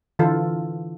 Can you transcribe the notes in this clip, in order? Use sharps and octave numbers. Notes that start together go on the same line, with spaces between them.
D3 E3 F4 A4